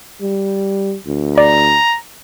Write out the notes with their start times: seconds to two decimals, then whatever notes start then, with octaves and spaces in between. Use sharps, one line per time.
0.21 G3
1.07 D2
1.38 D5 A#5